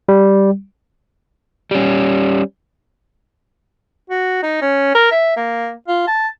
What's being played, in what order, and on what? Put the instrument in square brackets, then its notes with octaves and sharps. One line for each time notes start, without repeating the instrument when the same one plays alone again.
[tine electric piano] G3
[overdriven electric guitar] G3 C#4
[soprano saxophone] F#4
D#4
C#4
A#4
E5
A#3
F4
A5